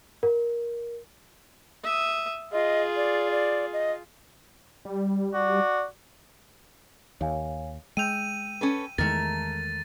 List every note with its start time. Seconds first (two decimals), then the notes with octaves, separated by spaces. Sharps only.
0.23 A#4
1.84 E5 D#6
2.53 F4 G#4 D#5
2.96 D5
3.31 D5
3.73 D#5
4.85 G3
5.34 F#4 D5
7.21 D#2 C#5 F5 G#5
7.97 G#3 G5 E6 G6 D#7 F7
8.61 C#4 A4 B4
8.98 E2 D#3 G#3 A3 A#4 A6